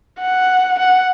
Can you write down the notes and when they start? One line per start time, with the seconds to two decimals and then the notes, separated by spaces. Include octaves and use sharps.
0.20 F#5
0.79 F#5